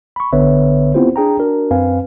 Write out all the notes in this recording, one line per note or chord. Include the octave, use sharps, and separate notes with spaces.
B5 C#6
A1 D3 B3 B4 C#5 E5
B3 C4 E4 F4 G4 C5
D4 G#4 G5 A#5
D4 F#4 A#4
F#2 C4 B4 F5 G#5